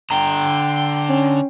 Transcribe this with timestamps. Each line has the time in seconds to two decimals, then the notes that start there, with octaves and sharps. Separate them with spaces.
0.11 D3 G5 A#5 C6
1.09 C#4